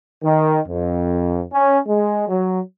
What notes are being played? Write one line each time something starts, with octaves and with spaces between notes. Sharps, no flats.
D#3
F2
C#4
G#3
F#3